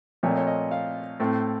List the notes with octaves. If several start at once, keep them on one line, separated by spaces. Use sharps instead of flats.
A#2 F3 A3 C4 C#5
D#5
C#5
D#5
F5
A2 A3 C4